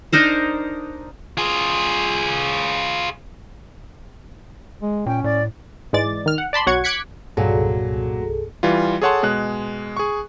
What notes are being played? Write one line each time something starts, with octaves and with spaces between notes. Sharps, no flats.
D4 D#4 A#4 C5
F4 G#4
G#3
A#2 C#4 G5
A2 D5
G#2 E3 G#3 D5 A6
D#3 F6
F#5
D5 A5 B5 C6
B1 F#4 C#5 F#5 C#6 G#6
D6 F#6 G#6 B6 C#7
C2 G2 A#2 F#3 G#4 A4
E3 G3 F4
G#4 A4 C#5 F#5 A5 C6
B2 G#3 F#6
G#4 C#6